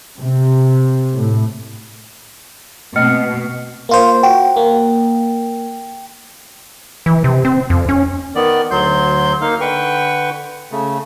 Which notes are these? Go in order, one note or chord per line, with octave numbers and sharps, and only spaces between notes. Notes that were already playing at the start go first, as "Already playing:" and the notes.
C3
A2
B2 A3 A#3 C4 D#5 F6 C#7
A#3 F4 C5
F#4 G5
A#3
E3
C3
C4
F2
C#4
D#3 B3 D5
D2 F#3 C6 G6
A#3 D#4 F5
D3 B4 G5 C#6
C#3 A3